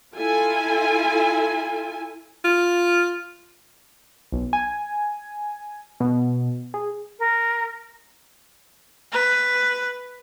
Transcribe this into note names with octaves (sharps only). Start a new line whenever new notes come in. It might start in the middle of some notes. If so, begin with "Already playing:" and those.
E4 F4 A4 G#5
F4
B1
G#5
B2
G#4
A#4
B4